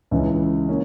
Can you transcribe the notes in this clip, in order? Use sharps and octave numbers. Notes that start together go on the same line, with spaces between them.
C#2 C#3 E3
A#3 C#4